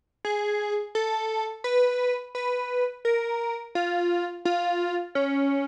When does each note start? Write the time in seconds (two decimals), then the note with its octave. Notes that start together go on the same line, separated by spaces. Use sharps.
0.25 G#4
0.95 A4
1.64 B4
2.35 B4
3.05 A#4
3.75 F4
4.45 F4
5.15 C#4